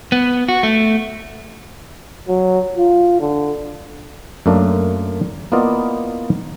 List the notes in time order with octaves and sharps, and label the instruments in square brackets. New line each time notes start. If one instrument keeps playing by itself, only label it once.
[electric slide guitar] B3
F#4
A3
[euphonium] F#3
F4
D3
[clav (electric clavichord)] F#2 A3 A#3 D4
A#3 B3 E4 F4 D5 D#5